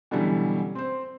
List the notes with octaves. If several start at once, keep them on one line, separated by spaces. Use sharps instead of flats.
B2 D3 E3 F#3 G3 C#4
C4 C5